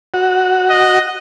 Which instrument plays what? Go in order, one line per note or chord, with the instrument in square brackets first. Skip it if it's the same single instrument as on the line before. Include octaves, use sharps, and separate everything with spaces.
[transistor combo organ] F#4
[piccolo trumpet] D#5